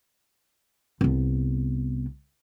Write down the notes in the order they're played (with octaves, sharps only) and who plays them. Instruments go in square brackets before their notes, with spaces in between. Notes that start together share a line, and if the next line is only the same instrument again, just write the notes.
[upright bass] C2 B3